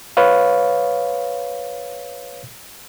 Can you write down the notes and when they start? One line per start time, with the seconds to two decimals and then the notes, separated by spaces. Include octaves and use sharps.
0.17 B4 C#5 F5